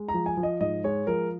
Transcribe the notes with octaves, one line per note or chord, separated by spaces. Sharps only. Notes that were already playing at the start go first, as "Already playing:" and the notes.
Already playing: G#3
A#5
F3
G#5
F3
D#5
G#2 D#5
G#3 C#5
F3 A#4